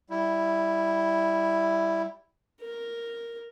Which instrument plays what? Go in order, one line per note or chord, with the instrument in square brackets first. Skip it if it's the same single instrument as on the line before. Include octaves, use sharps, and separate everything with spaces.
[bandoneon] G3 E4
[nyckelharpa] A#4